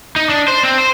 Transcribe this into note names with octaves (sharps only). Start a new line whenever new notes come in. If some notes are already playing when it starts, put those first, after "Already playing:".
D#4
D4
C5
C4
C5